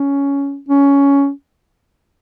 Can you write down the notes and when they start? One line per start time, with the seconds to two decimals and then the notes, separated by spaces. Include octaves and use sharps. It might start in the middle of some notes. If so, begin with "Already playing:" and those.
Already playing: C#4
0.69 C#4